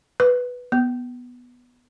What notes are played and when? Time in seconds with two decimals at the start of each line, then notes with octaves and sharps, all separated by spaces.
0.20 B4
0.72 B3